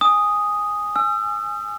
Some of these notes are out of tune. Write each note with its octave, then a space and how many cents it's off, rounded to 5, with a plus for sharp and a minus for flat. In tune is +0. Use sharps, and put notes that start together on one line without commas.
G#5 -10 D#6 +0
G#5 +0 E6 +40